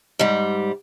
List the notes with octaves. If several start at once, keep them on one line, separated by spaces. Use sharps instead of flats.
G#2 G3